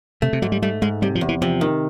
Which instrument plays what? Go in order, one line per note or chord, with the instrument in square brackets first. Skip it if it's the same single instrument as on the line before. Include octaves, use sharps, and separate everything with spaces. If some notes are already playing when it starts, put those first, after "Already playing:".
[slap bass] C3 [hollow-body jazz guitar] A3
[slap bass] C3
[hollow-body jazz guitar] G#2 [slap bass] F#3
[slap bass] G3
[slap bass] G3 [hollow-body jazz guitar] A3
[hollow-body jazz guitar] G#2 [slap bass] G#3
[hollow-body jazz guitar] C3 [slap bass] G3
[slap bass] F3
[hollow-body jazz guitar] E2
[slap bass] E3
[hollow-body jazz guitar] C3 [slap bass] F3
[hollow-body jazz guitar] D#3